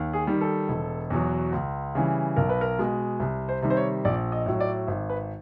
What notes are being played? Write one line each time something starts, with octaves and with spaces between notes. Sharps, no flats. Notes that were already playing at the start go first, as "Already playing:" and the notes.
Already playing: D#2
G#4
D#3 G3
A4
E1
E2 B2 F#3
C#2
C#3 E3 G3
B1 A#4
B4
A#4
B2 G#3
C2
C5
C3 D#3 G3
C5
C#5
A#1 D5
D#5
A2 F#3
D5
G#1
B4